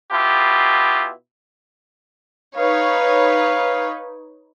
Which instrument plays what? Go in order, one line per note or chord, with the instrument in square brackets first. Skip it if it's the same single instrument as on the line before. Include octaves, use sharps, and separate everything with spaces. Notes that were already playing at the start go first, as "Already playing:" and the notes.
[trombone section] B2 E4 F4 G4
[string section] D#4 B4 C#5 [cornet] F5